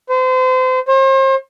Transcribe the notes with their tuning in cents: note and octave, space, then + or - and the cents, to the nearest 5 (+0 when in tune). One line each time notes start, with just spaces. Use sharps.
C5 -35
C5 +40